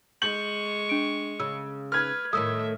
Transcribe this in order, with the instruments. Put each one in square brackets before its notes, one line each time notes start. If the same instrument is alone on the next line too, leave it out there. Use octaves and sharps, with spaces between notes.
[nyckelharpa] G#3 C#6 [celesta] G6 [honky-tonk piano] F#7
[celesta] D4 D7
[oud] C#3 [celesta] E6
[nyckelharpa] B4 [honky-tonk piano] F6 G#6
[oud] A2 D#3 A3 [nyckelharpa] E5 [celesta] D#6 E6